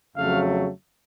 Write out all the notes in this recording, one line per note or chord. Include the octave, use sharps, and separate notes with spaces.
F2 C#3 F#3 A3 F5